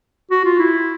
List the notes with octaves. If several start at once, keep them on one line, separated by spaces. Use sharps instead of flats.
F#4
F4
E4